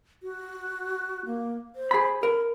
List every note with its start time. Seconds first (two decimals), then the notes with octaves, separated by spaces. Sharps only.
0.23 F#4
1.25 A#3
1.76 C5
1.91 G#4 B5
2.23 A#4 B5